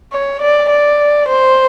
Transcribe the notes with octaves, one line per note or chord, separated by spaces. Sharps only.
C#5
D5
D5
C5